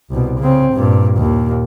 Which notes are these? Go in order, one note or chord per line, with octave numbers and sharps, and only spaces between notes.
C2 B2
C#3 C4
G2 A#2
D#2 A#2